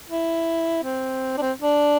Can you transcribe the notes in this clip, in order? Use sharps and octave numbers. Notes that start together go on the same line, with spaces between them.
E4
C4
D4
C4
D4